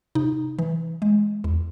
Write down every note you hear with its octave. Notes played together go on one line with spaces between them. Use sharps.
C3 D#4
E3
G#3
E2